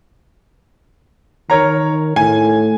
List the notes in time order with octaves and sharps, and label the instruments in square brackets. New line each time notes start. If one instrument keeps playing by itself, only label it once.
[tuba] D#3 [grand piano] A#4 C#5 A#5
[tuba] A2 [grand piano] G#5